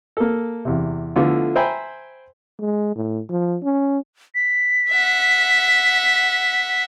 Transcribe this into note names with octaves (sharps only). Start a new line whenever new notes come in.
A#3 A4
E2 C3
D3 F3 A3 B3 E4 F4
C5 E5 G5 G#5 A#5 B5
G#3
A2
F3
C#4
B6
E5 F#5